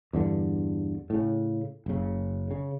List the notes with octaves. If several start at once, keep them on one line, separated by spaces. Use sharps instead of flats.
E2 G2 D3
A2 C#3
F#1 C#3
C#3